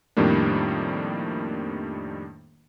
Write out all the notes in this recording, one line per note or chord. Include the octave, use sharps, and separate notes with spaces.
F2 A2 D#3 G3 A#3 D4